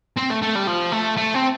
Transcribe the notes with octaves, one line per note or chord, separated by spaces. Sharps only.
C4
A3
A3
G3
F3
A3
A3
C4